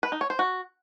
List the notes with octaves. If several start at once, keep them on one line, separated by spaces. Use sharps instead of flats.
B4
D#4
C#5
C5
F#4